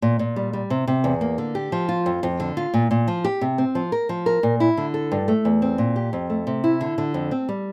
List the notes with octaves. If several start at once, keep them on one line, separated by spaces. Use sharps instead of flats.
A#2
A#2
G3
G3
C3
C3
E2
A#3
D3
G4
F3
F4
F2
F2
D3
F4
A#2
A#2
F3
G4
C3
C4
F3
A#4
F3
A#4
A#2
E4
D3
A4
G2
A3
E2
C4
A#2
G4
F2
A3
C3
E4
D3
D3
F2
C4
G3